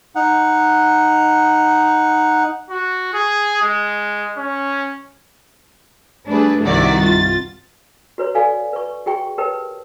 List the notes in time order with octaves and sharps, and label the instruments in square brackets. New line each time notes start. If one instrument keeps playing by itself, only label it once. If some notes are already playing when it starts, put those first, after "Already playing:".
[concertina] D#4 F#5
[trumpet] F#4
G#4
G#3
C#4
[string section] G3 A3 D4 G#4 B4
C2 G2 D#3 E4 F#4 D5
F4 A6
[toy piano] F#4 B4 C#5
F#4 A4 D5 F5 G#5
B4 C#6
F#4 G#4 G5 C#6
G4 A#4 B4 C#5 G5 A5